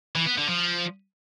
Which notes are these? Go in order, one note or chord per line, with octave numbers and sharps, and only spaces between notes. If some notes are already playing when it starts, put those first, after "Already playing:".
E3
B3
D3
F3